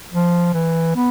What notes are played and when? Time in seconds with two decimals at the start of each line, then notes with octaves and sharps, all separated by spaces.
0.12 F3
0.53 E3
0.95 B3